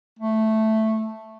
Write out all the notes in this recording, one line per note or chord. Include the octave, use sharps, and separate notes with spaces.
A3